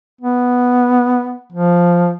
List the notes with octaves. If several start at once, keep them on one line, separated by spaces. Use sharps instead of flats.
B3
F3